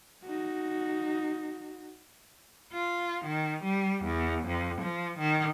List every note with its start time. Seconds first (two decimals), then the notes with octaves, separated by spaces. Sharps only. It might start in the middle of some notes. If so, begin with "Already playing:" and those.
0.25 D#4 F#4
2.73 F4
3.25 D#3
3.64 G3
4.04 E2
4.47 F2
4.81 F3
5.19 D#3